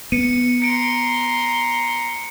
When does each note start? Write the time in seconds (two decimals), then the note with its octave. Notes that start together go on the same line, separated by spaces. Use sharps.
0.12 B3 C#7 D#7
0.62 A#5 C6 C#7 D7